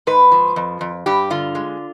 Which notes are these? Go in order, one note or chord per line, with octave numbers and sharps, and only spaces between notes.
G#2 B4
F3
F2
F2
G2 G4
D3 F4
G#3